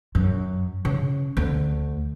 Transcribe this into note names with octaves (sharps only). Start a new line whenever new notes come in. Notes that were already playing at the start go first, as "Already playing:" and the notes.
F#2
C#3
D2